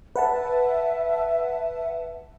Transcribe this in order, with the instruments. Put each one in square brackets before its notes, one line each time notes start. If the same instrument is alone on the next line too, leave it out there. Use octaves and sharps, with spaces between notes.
[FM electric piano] B4 F#5 A5 [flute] E5